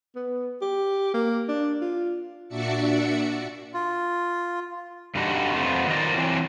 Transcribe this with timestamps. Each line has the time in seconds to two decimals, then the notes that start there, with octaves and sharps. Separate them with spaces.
0.15 B3
0.61 G4
1.14 A#3
1.48 D4
1.81 F4
2.49 A#2 D4 F#4 D5 E5 C#7
3.74 F4
5.15 G2 D3 G3 D4 D#4 F#4
5.54 F2 F3 A3 B3
5.88 D#3 F3 A#4 D5
6.14 E3 F#3 C4 D4